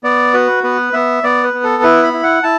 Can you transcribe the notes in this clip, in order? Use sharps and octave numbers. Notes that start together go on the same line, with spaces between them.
B3 D5
F#4 B4
B3 B4
B3 E5
B3 D5
B4
B3
A4
E4 B4
B5
E4
F#5
E4 A5